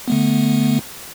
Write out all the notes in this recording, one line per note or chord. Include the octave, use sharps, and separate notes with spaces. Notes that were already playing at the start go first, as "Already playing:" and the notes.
D3 A3 B3